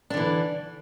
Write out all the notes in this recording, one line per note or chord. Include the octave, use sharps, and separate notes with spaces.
D3 E3 D4